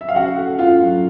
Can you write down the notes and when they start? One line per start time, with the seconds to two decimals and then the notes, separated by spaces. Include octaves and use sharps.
0.01 E5
0.09 F5
0.15 C#3 F#4 F#5
0.37 A3
0.58 C#3 F4 F5
0.81 F#3